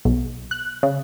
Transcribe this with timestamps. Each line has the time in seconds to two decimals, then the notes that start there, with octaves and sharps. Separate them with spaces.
0.05 B1
0.51 F#6
0.83 C#3